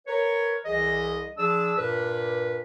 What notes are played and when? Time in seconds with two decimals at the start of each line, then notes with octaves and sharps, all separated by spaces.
0.07 A#4 B4 C#5
0.66 C2 E3 G#4 D#5
1.38 F3 D4 G#4 D5 E6
1.77 G2 A#2 A#4 B4